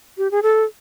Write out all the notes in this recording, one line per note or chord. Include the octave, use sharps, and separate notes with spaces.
G4
G#4
A4